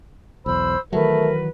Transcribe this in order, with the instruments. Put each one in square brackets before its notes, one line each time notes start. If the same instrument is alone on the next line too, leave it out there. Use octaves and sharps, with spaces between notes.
[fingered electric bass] B1 E2 [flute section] C5 B5 E6
[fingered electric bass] D#3 E3 F#3 [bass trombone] A3 [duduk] A#4 [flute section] B4